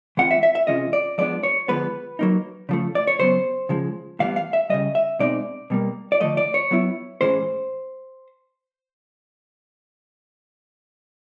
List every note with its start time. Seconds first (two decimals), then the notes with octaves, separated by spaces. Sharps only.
0.17 E3 G#3 C4 F4 F#5
0.31 E5
0.43 E5
0.55 E5
0.67 C3 E3 G#3 C#4 F4 D#5
0.93 D5
1.18 F3 G#3 B3 D4 D5
1.43 C#5
1.68 D3 F3 G#3 B3 B4
2.19 F#3 A#3 D#4
2.69 C#3 F3 A3
2.95 D5
3.07 C#5
3.19 C#3 F#3 B3 C5
3.69 C#3 F3 G#3
4.19 A2 E3 G3 B3 F5
4.36 F5
4.53 E5
4.70 C#3 E3 G3 D#5
4.95 E5
5.19 B2 G#3 C4 D#4 D5
5.70 B2 G3 A#3
6.12 D5
6.21 D3 F3 A3 D#5
6.37 D5
6.54 C#5
6.71 F#3 B3 E4
7.21 A2 E3 G#3 C#4 C5